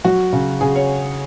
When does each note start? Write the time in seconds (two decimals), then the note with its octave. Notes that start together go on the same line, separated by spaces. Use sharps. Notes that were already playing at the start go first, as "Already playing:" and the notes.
0.05 F#3 F#4
0.33 C#3
0.61 C#3 G#4
0.75 C#5